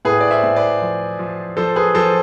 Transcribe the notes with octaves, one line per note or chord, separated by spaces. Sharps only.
A2 G#4 B4
D5
C5 E5
A2
B4 D5
F3
F3
F3 A4 C5
G#4 B4
F3 A4 C5